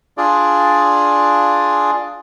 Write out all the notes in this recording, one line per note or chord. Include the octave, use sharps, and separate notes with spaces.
D4 F4 G#4 D5